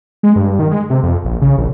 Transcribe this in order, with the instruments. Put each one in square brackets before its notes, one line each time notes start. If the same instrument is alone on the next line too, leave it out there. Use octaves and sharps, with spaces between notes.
[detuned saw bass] G#3
G2
D#3
G#3
C3
F2
A#1
C#3
A#1